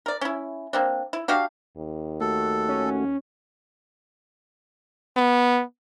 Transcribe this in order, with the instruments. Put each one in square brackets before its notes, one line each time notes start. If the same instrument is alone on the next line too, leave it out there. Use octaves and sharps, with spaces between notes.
[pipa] A#4 D5
C#4 E4
A#3 C4 D4
E4
D4 F#4 G4 F5
[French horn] D#2
[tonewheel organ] A3 F#4 [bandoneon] A4
[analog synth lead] C#4
[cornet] B3